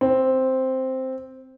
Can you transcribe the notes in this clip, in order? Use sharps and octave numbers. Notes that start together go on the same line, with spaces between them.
C4